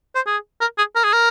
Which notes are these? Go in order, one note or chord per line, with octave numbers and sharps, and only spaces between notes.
C5
G#4
A#4
G#4
A#4
G#4
A#4